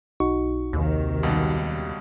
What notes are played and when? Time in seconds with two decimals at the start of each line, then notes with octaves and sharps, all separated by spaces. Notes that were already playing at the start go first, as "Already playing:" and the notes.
0.20 B1 D#4 F#4 C#6
0.73 D#2 C3 D#3
1.23 C#2 B2 G3